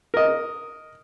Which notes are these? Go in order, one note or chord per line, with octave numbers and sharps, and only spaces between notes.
A#4 D#5